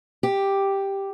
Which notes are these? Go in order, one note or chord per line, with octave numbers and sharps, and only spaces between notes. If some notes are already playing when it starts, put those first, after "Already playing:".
G4